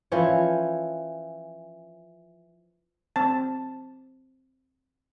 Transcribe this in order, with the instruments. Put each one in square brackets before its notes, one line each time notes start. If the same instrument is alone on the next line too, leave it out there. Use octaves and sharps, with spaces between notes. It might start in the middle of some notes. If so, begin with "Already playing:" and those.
[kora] E3 F3 C#4 C#5
[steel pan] C4 A5